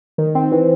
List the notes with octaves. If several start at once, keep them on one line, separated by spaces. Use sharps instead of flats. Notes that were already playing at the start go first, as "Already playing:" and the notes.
D#3
C4
E3